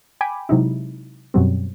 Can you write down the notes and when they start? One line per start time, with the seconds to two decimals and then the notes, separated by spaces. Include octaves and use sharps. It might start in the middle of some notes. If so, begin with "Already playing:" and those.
0.21 G5 G#5 B5 D6
0.49 C3 F#3 G#3 D#4 E4
1.34 F#2 B2 F#3 G3 C4